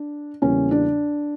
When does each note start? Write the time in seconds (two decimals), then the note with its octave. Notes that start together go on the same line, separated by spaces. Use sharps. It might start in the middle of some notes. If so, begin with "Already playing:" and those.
Already playing: D4
0.42 E2 C#3 G3 A#3 C#4
0.71 D4